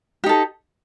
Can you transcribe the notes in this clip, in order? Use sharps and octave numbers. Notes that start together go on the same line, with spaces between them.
D#4 G4 A4